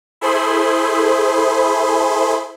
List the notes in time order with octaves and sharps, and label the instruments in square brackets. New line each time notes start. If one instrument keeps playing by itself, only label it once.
[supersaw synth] E4 G#4 A4 C5 B5 C6